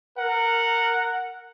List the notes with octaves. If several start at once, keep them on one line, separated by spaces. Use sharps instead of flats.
A#4 F#5